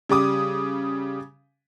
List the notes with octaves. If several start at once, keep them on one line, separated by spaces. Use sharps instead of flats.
C#3 G3 D6 D#6